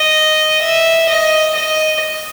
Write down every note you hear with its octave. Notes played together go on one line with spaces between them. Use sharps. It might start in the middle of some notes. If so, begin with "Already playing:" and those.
Already playing: D#5
E5
D#5
D#5